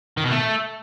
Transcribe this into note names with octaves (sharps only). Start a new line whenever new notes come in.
D#3
B2
A3